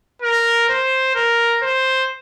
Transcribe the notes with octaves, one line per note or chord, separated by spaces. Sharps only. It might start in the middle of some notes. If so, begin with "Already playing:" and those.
A#4
C5
A#4
C5